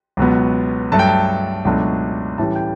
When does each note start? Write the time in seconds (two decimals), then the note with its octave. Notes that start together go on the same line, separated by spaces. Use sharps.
0.17 C#2 B2 F#3 B3
0.92 G2 F#3 A3 A5
0.99 G5
1.07 A5
1.65 C#2 B2 F#3 A3 D4
2.38 A2 E3 G3 C#4 A5
2.55 G5